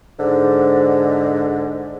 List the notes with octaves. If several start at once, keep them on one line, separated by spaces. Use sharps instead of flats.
G#2 D3